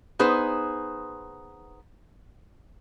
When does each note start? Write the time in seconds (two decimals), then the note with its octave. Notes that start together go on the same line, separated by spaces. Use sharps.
0.19 B3 D#4 G#4 B4 C5